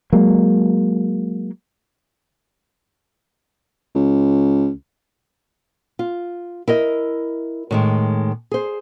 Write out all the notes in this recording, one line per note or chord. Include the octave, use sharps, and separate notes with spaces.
F#3 G#3 A#3
C#2
F4
E4 A#4 D#5
A2 D#3 G#3
G#4 C5